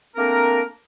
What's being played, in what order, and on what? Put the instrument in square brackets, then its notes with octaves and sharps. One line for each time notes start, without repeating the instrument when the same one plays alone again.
[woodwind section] A3 A#3 C4 D4 A#4